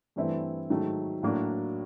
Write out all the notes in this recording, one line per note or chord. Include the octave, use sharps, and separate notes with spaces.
G2 E3 A3 C4 E4
G#2 D#3 F#3 A3
A2 F#3 A#3 D4 F#4